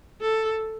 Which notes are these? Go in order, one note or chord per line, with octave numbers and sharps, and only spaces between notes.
A4